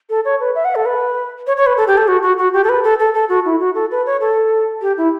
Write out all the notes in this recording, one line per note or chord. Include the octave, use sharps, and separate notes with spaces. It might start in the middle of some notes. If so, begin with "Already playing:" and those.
A4
C#5
B4
E5
F#5
A4
B4
C#5
C#5
B4
A4
G4
A4
F#4
F#4
F#4
G4
A4
B4
A4
A4
A4
F#4
E4
F#4
A4
B4
C#5
A4
G4
E4